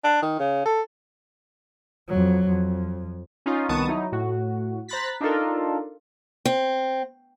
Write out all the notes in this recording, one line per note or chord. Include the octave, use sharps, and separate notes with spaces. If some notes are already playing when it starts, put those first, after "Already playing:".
D4
D#3
C#3
A4
F2 F#3
F2
C#4 D#4 F4 D#5
C2 D#3 B3 A5 C#6 D#6
F#3 D#4 E4
A2 F#4
C5 A#5 B5 F#6 A6 B6
D4 D#4 F4 A4 A#4
C4